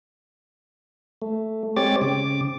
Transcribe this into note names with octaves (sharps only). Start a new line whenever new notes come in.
A3
G#3 C4 G4 C#5 D6 A6
C#3 D6